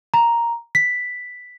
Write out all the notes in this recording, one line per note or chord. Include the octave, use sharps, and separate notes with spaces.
A#5
B6